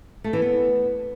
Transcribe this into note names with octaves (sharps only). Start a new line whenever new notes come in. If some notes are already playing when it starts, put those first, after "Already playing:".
A3
E3
B3